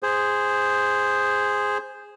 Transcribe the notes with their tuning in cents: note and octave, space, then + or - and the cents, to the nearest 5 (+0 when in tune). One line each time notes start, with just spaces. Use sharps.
G#4 -5 C5 +0